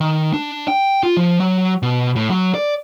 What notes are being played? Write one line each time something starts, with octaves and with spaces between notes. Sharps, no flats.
D#3
D4
G5
F4
F3
F#3
B2
A2
F#3
D5